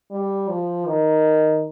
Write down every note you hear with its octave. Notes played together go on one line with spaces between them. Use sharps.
G3
F3
D#3